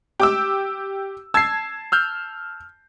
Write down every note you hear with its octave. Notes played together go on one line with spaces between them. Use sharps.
G4 D6 E6
A5 E6 G#6 C7
E6 F6 G6